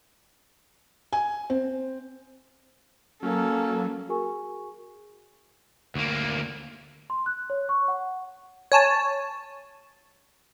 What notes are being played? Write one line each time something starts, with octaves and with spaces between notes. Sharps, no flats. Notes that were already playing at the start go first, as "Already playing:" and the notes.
G#5
C4
F#3 A#3 C#4 A4
F#4 G#4 A#4 G#5 C#6
D2 A#3
C6
F#6
C#5
C#6
F#5
C#5 G#5 A5